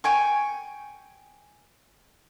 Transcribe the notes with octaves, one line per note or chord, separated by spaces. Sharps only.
G5 G#5 C#6